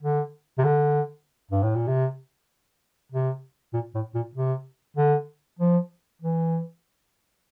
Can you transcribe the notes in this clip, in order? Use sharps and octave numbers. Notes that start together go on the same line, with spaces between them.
D3
C3
D3
G2
A2
A#2
C3
C3
A#2
A2
A#2
C3
D3
F3
E3